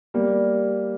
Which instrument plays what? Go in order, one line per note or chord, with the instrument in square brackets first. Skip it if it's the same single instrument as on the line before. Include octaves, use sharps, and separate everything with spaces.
[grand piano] G3 A#3